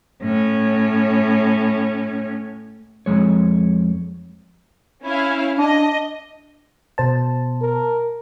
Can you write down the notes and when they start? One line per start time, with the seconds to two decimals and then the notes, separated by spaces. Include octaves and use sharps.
0.22 A2 C#4
3.06 F2 C#3 G#3 C#5
5.03 C#4 E4 F5
5.58 D4 D#5
6.98 B2 C5 A5
7.61 A#4